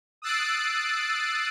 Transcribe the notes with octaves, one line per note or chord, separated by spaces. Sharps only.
D#6 E6 F#6 A6 C7 D7